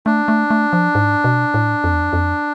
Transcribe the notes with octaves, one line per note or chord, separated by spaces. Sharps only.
A3 D4
A3
A3
F3
G#2
B2
A2
F2
E2
F2
F2